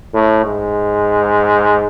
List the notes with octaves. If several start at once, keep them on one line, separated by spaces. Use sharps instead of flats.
A2
G#2